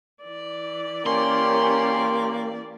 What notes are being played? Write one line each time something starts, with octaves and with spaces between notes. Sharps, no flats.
E3 D5
A#3 C#4 G4 A#4 C6